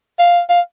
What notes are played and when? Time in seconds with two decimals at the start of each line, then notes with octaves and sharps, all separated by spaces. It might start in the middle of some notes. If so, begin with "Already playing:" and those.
0.19 F5
0.49 F5